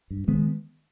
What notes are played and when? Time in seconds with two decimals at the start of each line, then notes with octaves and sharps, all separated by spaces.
0.10 G2
0.28 D#3 G#3 B3